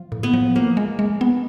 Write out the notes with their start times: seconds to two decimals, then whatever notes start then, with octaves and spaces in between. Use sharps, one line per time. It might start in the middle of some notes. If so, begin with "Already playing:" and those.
Already playing: F3
0.12 A2
0.23 B3
0.34 F3
0.56 F3 A#3
0.77 G#3
0.99 G#3
1.21 B3